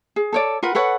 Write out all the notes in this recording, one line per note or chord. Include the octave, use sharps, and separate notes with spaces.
G#4
A4 C#5 D5
F4 A#4 B4 F#5
A4 B4 C#5 F#5